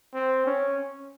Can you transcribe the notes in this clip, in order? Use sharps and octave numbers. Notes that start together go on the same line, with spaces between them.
C4
C#4